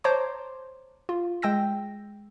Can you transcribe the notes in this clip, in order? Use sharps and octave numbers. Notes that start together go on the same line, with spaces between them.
C5 C#5 A5 A#5 C6 D6
F4
G#3 G5 E6 A#6